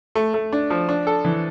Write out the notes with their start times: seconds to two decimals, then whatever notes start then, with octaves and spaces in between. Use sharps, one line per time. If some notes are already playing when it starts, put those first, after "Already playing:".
0.15 A3
0.34 A3
0.53 D4
0.70 F3
0.89 D4
1.07 A4
1.25 E3